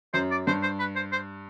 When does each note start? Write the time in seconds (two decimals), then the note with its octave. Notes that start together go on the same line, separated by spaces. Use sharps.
0.14 F#2 C5
0.31 D5
0.47 G2 C5
0.62 C5
0.79 B4
0.96 C5
1.12 C5